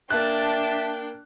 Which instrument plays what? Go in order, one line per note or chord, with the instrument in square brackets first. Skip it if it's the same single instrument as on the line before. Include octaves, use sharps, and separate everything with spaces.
[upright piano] A#3 F#6 [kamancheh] D4 G5 [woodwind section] E5 A5